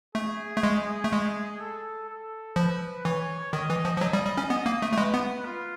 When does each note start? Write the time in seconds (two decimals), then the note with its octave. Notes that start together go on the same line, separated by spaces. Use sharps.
0.15 A3 G#4
0.57 A3
0.63 G#3
1.04 A3
1.13 G#3
1.60 A4
2.09 A4
2.56 F3 B4
3.05 E3 C#5
3.53 D#3 D#5
3.70 E3
3.85 F3
3.97 F3
4.01 F#3 D#5
4.13 G3
4.25 G3
4.37 C#4
4.49 B3 D#5
4.66 A#3
4.82 A3
4.93 A3
4.97 G#3 B4
5.14 B3
5.45 F4